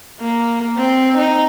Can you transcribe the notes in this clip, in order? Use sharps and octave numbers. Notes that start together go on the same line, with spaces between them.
A#3
C4
D#4